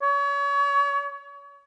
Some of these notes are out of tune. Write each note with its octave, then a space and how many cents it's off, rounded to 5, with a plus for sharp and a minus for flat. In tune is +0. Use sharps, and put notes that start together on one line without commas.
C#5 +35